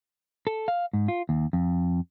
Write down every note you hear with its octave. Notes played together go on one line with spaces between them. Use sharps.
A4
F5
G#2
F4
D#2
F2